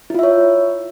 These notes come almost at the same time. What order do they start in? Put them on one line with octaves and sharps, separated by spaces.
E4 F4 E5 C#5